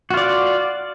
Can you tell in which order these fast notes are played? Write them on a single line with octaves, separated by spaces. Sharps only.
F#4 F4 D5